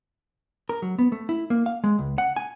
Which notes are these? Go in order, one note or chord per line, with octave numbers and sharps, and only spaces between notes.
A#4
F#3
B3
A3
E4
A#3
F5
G#3
C#2
F#5
G#5